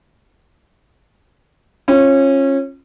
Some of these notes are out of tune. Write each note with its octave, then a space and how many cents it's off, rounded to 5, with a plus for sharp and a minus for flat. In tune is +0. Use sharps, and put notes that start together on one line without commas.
C#4 -25 F4 -5